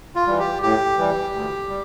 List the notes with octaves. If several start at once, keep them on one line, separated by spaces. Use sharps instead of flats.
F4
E3 G3
G4
A2 G4
E3 G3
D2
G3